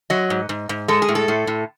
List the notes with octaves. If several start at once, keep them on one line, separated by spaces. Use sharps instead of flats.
F#3 D#5
G#2
G#2
G#2
G#3 A4
G#4
A2
A4
A2
A2